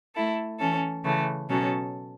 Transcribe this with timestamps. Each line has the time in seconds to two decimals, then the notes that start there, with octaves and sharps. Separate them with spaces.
0.15 A3 E4 A4
0.60 E3 C#4 A4
1.04 C#3 E3 A3
1.49 B2 F#3 C#4 A4